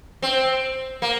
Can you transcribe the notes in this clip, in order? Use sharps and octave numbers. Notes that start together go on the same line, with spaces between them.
C4
A#3